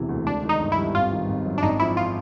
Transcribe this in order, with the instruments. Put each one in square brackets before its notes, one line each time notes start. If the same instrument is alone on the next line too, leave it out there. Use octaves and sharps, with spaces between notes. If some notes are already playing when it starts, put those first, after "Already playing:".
Already playing: [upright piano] E1 C3 E3
D2
[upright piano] G#3 [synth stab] D4
[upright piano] D#3
[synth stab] D#4
[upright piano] G1
[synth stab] E4
[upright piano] G2
[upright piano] G#1 [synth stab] F4
[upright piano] D#3
G#1
F#2
[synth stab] D4
[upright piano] G#1 [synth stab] D#4
[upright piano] F3 [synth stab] E4
[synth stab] F4